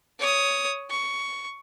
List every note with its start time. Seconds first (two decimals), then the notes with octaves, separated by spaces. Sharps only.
0.19 C#5 D#6
0.90 C#6